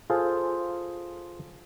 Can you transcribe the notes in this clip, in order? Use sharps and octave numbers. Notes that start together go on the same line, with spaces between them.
F4 G#4 A4 C5